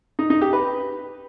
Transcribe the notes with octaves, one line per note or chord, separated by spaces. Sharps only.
D#4
D#4
G4
B4